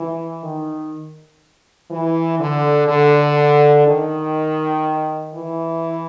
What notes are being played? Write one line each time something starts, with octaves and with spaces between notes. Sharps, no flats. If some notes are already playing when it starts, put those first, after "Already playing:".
Already playing: E3
D#3
E3
D3
D3
D#3
E3